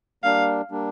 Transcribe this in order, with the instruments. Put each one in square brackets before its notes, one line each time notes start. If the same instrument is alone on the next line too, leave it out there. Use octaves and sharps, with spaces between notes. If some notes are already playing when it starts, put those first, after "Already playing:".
[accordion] G3 A#3 D4 [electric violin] F5
[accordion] G3 A#3 D4